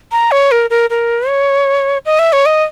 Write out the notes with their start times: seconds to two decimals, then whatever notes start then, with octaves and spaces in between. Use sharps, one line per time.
0.12 A#5
0.31 C#5
0.51 A#4
0.70 A#4
0.90 A#4
1.28 C#5
2.06 D#5
2.19 E5
2.33 C#5
2.46 D#5